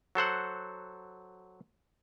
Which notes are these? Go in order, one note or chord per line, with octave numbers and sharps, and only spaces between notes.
F#3 A4 C5 F#5